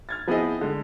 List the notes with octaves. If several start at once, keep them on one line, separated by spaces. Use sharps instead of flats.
F6 G#6 A6
F3 B3 C4 E4 G#4 D#5
D3 G#3